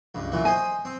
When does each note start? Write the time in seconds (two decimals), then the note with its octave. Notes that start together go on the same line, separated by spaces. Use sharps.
0.15 C#2 G2
0.32 A#2 E3 F#3
0.45 C5 D#5 G#5 B5
0.85 C4